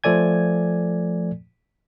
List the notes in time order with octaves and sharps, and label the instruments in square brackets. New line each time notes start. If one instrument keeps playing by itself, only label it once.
[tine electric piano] F3 A3 A4 D5 G#5 G#6